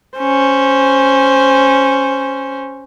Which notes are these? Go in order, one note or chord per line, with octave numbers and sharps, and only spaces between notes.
C#4 C5